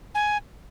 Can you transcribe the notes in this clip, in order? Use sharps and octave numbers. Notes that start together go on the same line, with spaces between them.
G#5